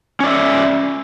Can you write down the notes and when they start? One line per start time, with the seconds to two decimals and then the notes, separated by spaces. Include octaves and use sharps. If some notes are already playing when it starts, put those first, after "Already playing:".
0.20 C#4
0.23 D5
0.27 E5